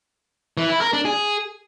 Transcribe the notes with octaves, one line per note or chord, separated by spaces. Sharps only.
E3
E4
A#4
D4
G#4